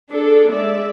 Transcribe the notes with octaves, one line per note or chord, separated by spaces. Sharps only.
D4 G#4 A4
G#3 D5 E5